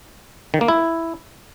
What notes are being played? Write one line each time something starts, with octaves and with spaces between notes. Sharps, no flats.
D#3
A#3
E4